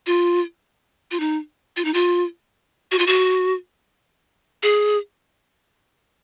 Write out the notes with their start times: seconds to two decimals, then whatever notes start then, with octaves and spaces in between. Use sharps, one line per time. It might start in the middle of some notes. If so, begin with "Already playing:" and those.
0.06 F4
1.11 F4
1.20 D#4
1.77 F4
1.85 D#4
1.94 F4
2.92 F#4
2.99 F4
3.07 F#4
4.63 G#4